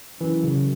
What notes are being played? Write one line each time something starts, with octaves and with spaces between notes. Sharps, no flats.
F#2 E3
C#3